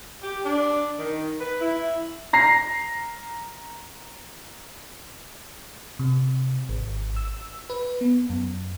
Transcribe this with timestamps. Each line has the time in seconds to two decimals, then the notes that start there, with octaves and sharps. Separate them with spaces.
0.22 G4
0.45 D4
0.99 D#3
1.40 B4
1.61 E4
2.33 A#5 A#6 C7
5.99 C3
6.69 G#1
7.16 E6
7.70 B4
8.01 B3
8.30 F#2